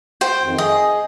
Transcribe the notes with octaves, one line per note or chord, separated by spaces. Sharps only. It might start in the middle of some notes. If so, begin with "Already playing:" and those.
C5 G5
F2 D#3
G#4 D#5